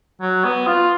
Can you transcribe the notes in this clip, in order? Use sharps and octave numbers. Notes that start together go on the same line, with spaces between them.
F#3
B3
F4